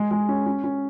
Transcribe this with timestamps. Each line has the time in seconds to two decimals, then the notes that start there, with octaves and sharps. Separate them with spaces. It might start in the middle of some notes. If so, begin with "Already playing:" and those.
Already playing: G#3
0.11 G#3
0.29 C#4
0.46 C#4
0.64 C#4